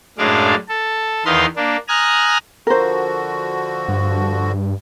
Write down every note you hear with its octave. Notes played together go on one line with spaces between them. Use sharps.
F#2 A2 G#3 D4 D5 F5
A4
E2 D#3 B4 D#5 F5 C6
A#3 D4
G#5 A#5 D#6 F6 F#6
D3 F3 F#4 A#4 C5
G2